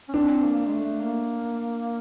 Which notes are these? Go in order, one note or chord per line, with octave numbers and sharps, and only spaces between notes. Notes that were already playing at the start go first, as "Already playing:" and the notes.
C#4
C4 D4
A#3
G#3
A3
A#3